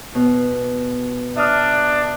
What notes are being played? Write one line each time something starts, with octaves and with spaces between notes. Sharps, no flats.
B2
D4 E5 D#6 F6